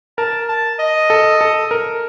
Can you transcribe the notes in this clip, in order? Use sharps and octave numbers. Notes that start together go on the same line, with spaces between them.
A#4 A5
A5
D#5
A4
A4
A#4